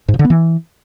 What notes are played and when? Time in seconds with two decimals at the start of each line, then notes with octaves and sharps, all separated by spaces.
0.08 G#2
0.14 A#2
0.19 D3
0.25 B3
0.30 E3